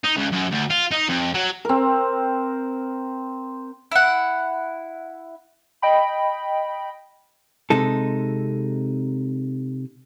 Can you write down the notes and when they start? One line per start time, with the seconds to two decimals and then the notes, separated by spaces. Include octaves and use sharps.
0.04 D#4
0.16 C#2
0.32 F#2
0.51 D2
0.70 F4
0.92 D#4
1.09 F2
1.34 F#3
1.65 C4 A#4
3.91 E4 F#5
5.82 D#5 G5 B5
7.70 C3 G#3 D#4 A4